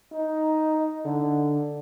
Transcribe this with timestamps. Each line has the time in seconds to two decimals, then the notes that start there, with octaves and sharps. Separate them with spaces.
0.12 D#4
1.05 D3